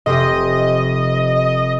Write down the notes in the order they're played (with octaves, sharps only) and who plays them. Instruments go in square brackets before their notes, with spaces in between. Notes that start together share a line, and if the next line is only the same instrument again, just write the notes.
[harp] F1 C4 G4 [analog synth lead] D#5